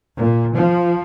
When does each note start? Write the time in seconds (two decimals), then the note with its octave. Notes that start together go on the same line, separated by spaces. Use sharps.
0.17 A#2
0.57 F3